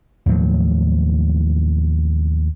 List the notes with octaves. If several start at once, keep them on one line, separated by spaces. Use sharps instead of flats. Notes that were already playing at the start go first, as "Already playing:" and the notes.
D#2 A2 F3 F#3